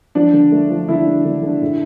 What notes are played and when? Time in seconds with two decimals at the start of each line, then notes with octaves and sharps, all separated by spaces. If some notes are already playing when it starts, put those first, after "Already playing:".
0.15 F3 D4
0.33 D3
0.52 A3
0.70 F3
0.88 D3 E4
1.07 D3
1.25 D3
1.43 D3
1.62 A2